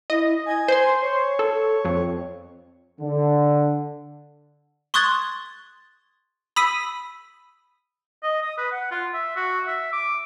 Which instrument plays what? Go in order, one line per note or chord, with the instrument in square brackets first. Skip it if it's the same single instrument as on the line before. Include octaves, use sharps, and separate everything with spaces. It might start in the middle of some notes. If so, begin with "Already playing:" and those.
[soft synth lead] E4 [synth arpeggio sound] D#5
[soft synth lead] G#5
[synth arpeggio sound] C5 C6
[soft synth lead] C#5
[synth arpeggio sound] A4
F2
[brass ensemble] D3
[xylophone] C6 C#6 D#6 F#6 G#6 A6
B5 D#6 E6 B6 D#7
[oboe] D#5
D#6
B4
F#5
F4
E5
F#4
E5
D6